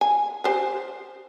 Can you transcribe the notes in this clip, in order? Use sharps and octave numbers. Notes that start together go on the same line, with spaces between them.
G#5
G4 C5 G#5